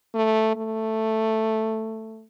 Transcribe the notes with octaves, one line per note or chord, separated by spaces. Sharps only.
A3
A3